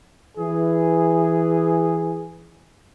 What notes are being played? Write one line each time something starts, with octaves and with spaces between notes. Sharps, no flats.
E3 G#4